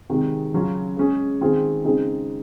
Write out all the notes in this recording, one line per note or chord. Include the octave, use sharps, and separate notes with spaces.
C3 D#3 G#3
C#3 F#3 C#4 F4
G#3 C#4 G#4
D#3 G#3 C4 F4 G#4
C#3 G#3 C4 D#4 G#4